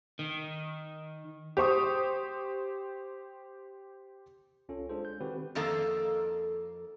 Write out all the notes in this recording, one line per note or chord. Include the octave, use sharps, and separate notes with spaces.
D#3
G4 C5 C#6 D#6
C2 C#4 F4 A4
G#3 D4 F4 G#4 A4 C5
G6
D#3 C4 F#4 G4 B4
F2 D#3 A#3 A4